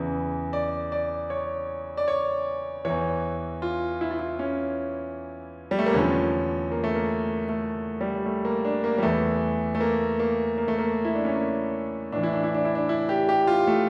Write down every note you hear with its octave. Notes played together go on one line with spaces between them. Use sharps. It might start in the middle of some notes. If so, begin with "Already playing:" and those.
Already playing: E2 C#3 E3
D5
D5
C#5
D5
C#5
E2 E3 C#5
F4
E4
F4
E4
C#4
G3
A3
A#3
E2 D3 F3 C#4
A#3
A3
A#3
A3
G3
A3
A#3
D4
A#3
G3
E2 E3 A3
A3
A#3
A#3
A#3
A3
A#3
E4
D4
C#4
A#3
A2 E3 D4
E4
D4
E4
D4
E4
D4
E4
G4
G4
F4
A3